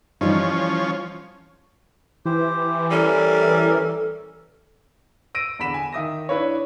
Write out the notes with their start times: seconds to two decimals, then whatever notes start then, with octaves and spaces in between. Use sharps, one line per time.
0.21 E3 F3 G3 C#4 D#4
2.25 E3 G4 C5
2.91 G3 C#4 A4 A#4
5.35 E6 A#6 D7 D#7
5.59 E2 D3 B5 B6 E7
5.74 G#5
5.93 D#3 E5 D#6 A#6
6.29 D4 E4 B4 C#5